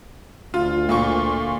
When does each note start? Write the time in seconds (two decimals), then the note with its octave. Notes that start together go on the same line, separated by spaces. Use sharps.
0.54 D2 F4
0.89 A#2 F4 C#6